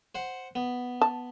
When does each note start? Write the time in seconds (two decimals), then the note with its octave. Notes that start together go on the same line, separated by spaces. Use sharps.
0.15 C5 F#5
0.55 B3
1.01 A5